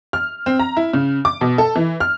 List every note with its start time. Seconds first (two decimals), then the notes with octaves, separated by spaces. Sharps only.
0.13 F6
0.46 C4
0.59 A#5
0.77 E4
0.93 C#3
1.25 D6
1.41 B2
1.58 A4
1.76 E3
2.00 F6